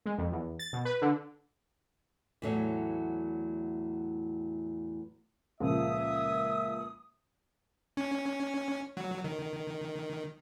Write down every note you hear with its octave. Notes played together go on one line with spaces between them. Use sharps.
G#3
F2
E2
A6
B2
B4
D3
E2 A2 F#3
C#2 A#2 F3 E5 D#6
C#4
F#3
D#3